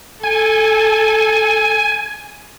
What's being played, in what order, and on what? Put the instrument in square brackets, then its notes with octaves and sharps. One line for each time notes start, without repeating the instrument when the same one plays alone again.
[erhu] A4 [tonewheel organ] G#5